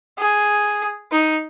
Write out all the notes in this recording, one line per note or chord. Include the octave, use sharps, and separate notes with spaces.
G#4
D#4